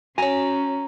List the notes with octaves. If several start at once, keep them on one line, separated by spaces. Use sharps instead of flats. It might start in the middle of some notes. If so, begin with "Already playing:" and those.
C#4 F#4 C#5 G#5 A#5